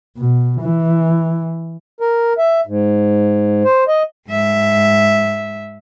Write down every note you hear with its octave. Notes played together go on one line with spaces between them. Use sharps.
B2
E3
A#4
E5
G#2
C5
D#5
G#2 E5